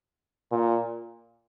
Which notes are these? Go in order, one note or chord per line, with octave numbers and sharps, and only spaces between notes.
A#2